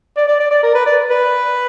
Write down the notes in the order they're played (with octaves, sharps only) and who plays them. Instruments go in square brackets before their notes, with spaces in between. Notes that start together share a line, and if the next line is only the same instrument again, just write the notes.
[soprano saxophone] D5
D5
D5
D5
A#4
B4
D5
B4